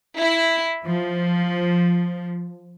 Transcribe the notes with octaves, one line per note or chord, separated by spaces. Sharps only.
E4
F3